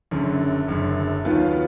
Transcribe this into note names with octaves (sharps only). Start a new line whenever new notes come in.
F#1 F#2 D3
F#1 F#2 D3
D#2 D#3 F#3 B3 F4